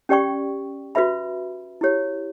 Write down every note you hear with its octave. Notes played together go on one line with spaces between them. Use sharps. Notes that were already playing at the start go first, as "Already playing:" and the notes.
C#4 G4 D5 G5 C#6
F#4 B4 E5 B5
E4 G4 C#5